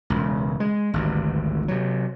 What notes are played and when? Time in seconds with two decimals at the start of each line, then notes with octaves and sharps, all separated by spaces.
0.10 E1 C#2
0.60 G#3
0.94 G#1 D2 G2
1.68 C3 F#3